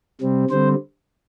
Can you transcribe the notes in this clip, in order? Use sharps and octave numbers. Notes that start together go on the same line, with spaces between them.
C3 G3 C4
D3 G3 C4 C5